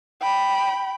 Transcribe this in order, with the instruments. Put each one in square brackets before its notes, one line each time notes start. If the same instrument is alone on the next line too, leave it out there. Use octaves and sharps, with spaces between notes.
[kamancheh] G5 B5